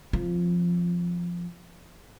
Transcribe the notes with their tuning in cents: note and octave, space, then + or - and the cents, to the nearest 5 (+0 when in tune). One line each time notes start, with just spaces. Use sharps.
F3 +0 C4 +0